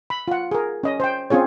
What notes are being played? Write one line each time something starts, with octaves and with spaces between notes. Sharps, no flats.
B5
F4 F#5
G#4 A#4
C#4 D#5
C5 G5
C4 C#4 F4 G#4 C#5